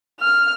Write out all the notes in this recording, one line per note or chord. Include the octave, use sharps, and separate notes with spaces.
F6